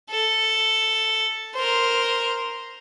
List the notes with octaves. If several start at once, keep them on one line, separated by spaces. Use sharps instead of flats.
A4
A#4 C5